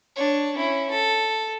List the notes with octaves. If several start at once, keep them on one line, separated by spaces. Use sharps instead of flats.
D4 C#5
C#4 E4
A4